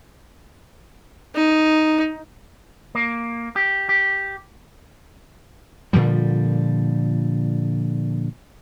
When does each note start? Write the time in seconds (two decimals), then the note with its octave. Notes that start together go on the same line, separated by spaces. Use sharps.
1.35 D#4
2.95 A#3
3.56 G4
3.89 G4
5.93 A#2 D3 F3 G3